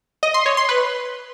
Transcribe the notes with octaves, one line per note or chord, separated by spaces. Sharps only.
D#5
C6
C#5
C6
B4